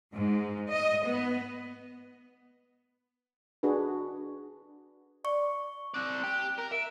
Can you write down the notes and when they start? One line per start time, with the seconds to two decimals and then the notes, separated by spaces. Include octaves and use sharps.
0.12 G#2
0.71 D#5
1.05 B3
3.63 D4 F#4 G#4 B4
5.25 D5 C#6
5.94 C4 D5 F#6
6.24 G4
6.59 A#4
6.72 E5 D7